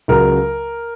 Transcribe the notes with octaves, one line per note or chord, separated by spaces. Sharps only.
C#2 C#3 F#3 A#4